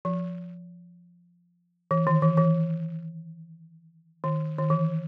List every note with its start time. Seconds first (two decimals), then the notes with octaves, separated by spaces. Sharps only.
0.05 F3
1.91 E3
2.07 D#3
2.22 E3
2.37 E3
4.24 D#3
4.58 D#3
4.70 E3